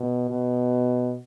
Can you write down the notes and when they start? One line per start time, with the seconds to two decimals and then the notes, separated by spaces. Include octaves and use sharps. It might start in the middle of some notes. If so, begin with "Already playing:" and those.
Already playing: B2
0.30 B2